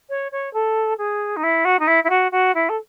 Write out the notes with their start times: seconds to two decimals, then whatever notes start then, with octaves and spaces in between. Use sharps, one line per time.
0.09 C#5
0.32 C#5
0.53 A4
0.98 G#4
1.36 D#4
1.43 E4
1.65 F#4
1.79 D#4
1.87 E4
2.04 E4
2.09 F#4
2.31 F#4
2.54 E4
2.69 A4